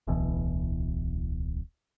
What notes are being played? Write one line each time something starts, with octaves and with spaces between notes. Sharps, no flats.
D1 B1 B2 E3